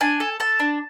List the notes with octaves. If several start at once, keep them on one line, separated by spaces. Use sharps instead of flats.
D4 G#5
A4
A4 A5
D4